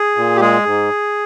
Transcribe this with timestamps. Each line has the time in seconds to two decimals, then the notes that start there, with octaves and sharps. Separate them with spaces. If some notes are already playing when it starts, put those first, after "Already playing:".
Already playing: G#4
0.16 A#2
0.36 G4
0.40 G#3 G#4
0.66 G#2